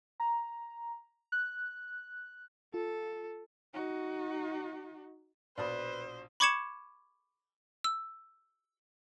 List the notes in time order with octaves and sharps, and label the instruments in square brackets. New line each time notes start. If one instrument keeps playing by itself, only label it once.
[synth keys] A#5
F#6
[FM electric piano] F4 [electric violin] A4
[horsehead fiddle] D#4 F#4
[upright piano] A#1 B2 D#6 [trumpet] B4 [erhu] C5 [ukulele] D5 A5 B5
[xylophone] B5 C#6 D6 G#6 C#7 E7
E6